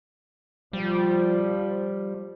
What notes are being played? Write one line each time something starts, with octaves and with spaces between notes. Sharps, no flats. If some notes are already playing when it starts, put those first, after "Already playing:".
F3 G3